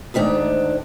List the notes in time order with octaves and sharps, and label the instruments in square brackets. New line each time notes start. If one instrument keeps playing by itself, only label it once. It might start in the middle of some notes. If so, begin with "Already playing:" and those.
[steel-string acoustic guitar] D2 G#2 D#3 D4